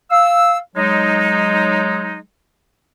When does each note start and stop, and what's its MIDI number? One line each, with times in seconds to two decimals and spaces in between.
0.10 0.57 77
0.10 0.57 88
0.76 2.19 54
0.76 2.19 56
0.76 2.19 63